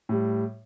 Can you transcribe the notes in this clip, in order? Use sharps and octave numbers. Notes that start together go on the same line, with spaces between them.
A2 G3